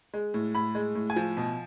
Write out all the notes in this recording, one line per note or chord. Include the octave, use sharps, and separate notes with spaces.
G#3
A2
A2 B5
G#3
A2
G#5
F3
B2